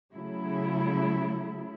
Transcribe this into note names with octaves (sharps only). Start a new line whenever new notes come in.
C#3 F#3 A3 E4